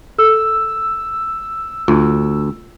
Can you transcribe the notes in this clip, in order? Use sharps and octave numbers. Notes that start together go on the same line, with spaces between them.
A4 E6
D2 F4